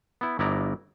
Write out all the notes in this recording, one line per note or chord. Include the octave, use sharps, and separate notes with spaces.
B3 E4
G1 E4 D5 D#5 A#5